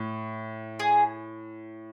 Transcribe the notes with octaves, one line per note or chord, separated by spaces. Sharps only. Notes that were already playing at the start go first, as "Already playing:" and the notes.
Already playing: A2
G#4